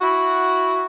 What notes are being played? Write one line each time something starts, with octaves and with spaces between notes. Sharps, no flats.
E4 F#4